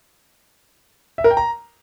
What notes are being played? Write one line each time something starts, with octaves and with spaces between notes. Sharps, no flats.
E5
A#4
G5
A#5